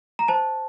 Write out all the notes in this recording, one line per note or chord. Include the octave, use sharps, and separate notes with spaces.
A#5
C5 A5